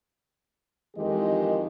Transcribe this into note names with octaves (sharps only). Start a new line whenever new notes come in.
F2 D#3 E3 G#3 G4 D#5